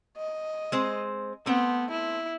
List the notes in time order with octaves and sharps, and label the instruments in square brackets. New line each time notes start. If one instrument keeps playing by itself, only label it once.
[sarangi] D#5
[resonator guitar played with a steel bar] G#3 C4 C5
[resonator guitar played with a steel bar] A3 C4 [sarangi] B3
[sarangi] E4